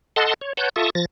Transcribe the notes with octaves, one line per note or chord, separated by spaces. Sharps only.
A4 D#5 F#5 A5 C6
C#5
B4 C#5 F#5 A5 G6
F4 A4 E5 A5 C#6 D#6
F3 A6 A#6